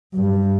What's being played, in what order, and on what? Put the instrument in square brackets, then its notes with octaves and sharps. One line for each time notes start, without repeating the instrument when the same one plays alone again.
[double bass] G2